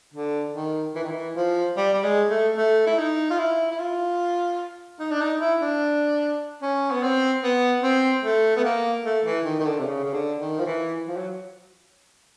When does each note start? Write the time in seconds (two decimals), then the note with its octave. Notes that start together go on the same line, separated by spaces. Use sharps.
0.14 D3
0.54 D#3
0.95 E3
1.03 D#3
1.10 E3
1.36 F3
1.77 G3
1.93 G3
2.04 G#3
2.30 A3
2.57 A3
2.87 E4
2.98 D#4
3.30 F4
3.38 E4
3.71 E4
3.79 F4
5.00 D#4
5.11 D4
5.21 D#4
5.40 E4
5.61 D4
6.62 C#4
6.91 B3
7.03 C4
7.43 B3
7.83 C4
8.24 A3
8.56 B3
8.64 A#3
9.05 A3
9.25 E3
9.45 D#3
9.59 D#3
9.66 D3
9.79 C3
9.86 C#3
10.04 C#3
10.13 D3
10.40 D#3
10.59 F3
10.66 E3
11.08 F3
11.17 F#3